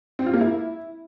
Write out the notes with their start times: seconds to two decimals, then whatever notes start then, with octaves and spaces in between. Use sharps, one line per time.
0.19 C4
0.26 F4
0.34 A#3
0.41 E4